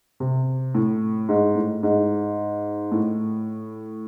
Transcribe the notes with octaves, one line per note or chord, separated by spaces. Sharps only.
C3
A2
G#2
A2
G#2
A2